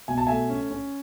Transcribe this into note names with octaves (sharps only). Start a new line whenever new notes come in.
B2 G#5
A5
A3 E5 G#5
C#4
C#4